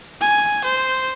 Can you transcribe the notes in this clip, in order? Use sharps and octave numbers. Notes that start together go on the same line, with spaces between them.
G#5
C5